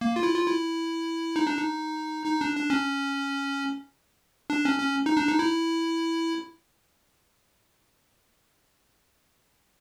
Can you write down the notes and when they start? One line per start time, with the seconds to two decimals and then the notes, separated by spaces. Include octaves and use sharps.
0.01 A#3
0.16 F4
0.23 E4
0.36 F4
0.46 E4
1.36 D#4
1.47 D4
1.57 D#4
2.26 D#4
2.41 D4
2.56 D4
2.70 C#4
4.50 D4
4.65 C#4
4.80 C#4
5.06 D#4
5.17 D4
5.29 D#4
5.39 E4